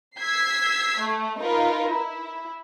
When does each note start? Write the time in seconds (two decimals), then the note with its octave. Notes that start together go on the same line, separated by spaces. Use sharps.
0.20 E6 G#6 B6 C7
1.00 A3
1.39 D#4 F4 A#4 B4
1.88 E4